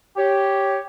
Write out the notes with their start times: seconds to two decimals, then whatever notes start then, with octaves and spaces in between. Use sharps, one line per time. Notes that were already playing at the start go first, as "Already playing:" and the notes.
0.17 G4 C#5